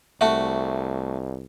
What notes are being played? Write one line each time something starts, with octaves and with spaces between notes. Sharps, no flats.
C2 A3 F#4 E5